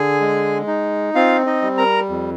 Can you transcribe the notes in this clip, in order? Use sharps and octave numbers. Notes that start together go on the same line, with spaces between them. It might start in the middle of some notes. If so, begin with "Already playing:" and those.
Already playing: D3 G#4 G#5
G#3
D#4
C4 F4 F5
D#4 D#5
G3
A#4 A#5
F2